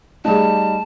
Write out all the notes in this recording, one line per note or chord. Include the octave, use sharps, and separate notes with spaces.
G3 A3 D#4 G#4 A5